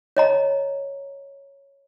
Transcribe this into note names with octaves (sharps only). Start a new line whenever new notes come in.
C#5 D#5 A#5